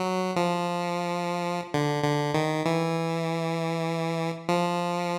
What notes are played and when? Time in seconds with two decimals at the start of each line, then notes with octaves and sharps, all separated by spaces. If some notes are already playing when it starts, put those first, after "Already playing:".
Already playing: F#3
0.36 F3
1.74 D3
2.04 D3
2.34 D#3
2.66 E3
4.49 F3